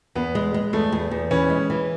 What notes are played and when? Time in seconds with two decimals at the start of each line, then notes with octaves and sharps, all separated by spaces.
0.15 E2 B3
0.35 G#3
0.54 G#3
0.73 E2 A3
0.92 E2
1.11 E2
1.31 E3 C#4
1.50 G#3
1.70 E3